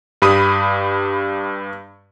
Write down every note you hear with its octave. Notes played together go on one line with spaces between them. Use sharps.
G2 G4 B5 D#6 D#7